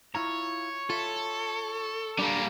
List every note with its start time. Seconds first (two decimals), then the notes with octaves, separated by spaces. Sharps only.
0.15 E4 F4 C#5 A#5
0.90 F4 A4 E5
2.19 G3 A#3 D4